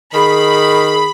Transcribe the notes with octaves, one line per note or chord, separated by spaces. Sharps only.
D#3 G#4 B5